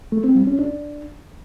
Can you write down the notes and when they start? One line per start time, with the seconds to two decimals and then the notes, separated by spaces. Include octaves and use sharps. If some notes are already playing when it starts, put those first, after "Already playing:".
0.12 A3
0.24 C4
0.36 G3
0.47 C#4
0.59 D4